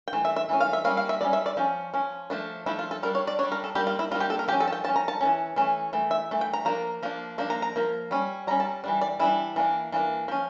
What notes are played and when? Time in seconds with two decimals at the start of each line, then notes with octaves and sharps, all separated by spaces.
0.08 G5
0.13 E3 A3
0.25 E5
0.36 E5
0.49 E3 A3 C#4
0.60 F5
0.73 E5
0.84 G3 A#3 C#4 F5
0.97 F5
1.09 E5
1.21 G3 A#3 C#4 D5
1.33 E5
1.46 D5
1.57 F3 C#4
1.94 F3 C#4
2.30 F3 A3 D4
2.66 F3 A3 D4 E4
2.79 F4
2.91 A4
3.03 G3 D4 A#4
3.15 C#5
3.27 D5
3.39 G3 D4 C#5
3.52 A#4
3.64 A4
3.75 G3 A#3 D4 G4
3.87 F4
3.99 E4
4.11 G3 A#3 D4 F4
4.20 G4
4.30 A4
4.39 A#4
4.48 F3 G4
4.52 C#4
4.60 A4
4.68 A5
4.72 G5
4.84 F3 A5
4.88 C#4
4.96 A#5
5.08 A5
5.21 E3 A3 C#4
5.56 E3 A3 C#4
5.93 E3 A3
6.11 E5
6.31 E3 A3
6.41 G5
6.53 A#5
6.65 F3 A#3 D4 A#5
7.03 F3 A#3 D4
7.38 F3 A#3 D4
7.50 A#5
7.62 A#5
7.76 F3 A#3
8.11 G3 C#4
8.47 G3 A#5
8.51 C#4
8.60 A5
8.84 E3 G3 D4
9.01 D5
9.19 E3 G3 D4 E4
9.56 E3 A#3 D4
9.92 E3 A#3 D4
10.28 F3 C#4